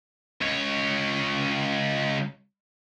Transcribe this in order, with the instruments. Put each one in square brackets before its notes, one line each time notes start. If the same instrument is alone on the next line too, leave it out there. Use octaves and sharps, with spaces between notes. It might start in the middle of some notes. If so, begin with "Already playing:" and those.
[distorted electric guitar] C#2 C#5